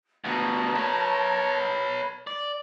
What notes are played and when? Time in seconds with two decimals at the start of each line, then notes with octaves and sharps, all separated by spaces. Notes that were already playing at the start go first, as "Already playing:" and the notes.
0.24 D2 B2 A#4 A5
0.75 B4 C#5
2.27 D5